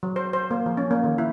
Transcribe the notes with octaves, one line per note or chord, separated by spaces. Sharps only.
F#3
C5
C5
A#3
F3
C#4
A#3
D#3
E4